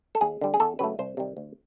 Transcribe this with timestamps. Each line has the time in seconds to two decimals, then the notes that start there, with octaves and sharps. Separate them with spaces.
0.15 A4
0.21 D#2 G#4
0.41 D3 G3
0.54 G#4
0.60 E2 A4
0.79 C#3 F#3 A3 B4
0.99 C2 C5
1.17 C3 D#3 G3
1.37 D2